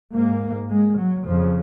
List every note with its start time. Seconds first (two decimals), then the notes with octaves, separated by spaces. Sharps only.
0.14 G#2 A#3
0.70 G#3
0.98 F#3
1.26 F2 C#3 F3